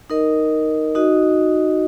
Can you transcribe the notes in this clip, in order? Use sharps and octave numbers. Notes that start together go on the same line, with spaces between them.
D#4 A#4 D#5
D#4 F#4 D#5